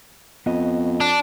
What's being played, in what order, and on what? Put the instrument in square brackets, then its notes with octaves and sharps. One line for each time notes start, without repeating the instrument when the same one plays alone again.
[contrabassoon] F2 [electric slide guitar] B3 D#5
[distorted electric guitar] D4